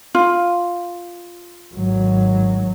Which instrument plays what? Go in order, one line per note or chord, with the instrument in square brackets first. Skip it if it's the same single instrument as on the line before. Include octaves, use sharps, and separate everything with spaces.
[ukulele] F4
[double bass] G#1 F#3